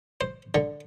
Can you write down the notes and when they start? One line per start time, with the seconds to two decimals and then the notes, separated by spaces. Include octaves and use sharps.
0.21 C5
0.55 D3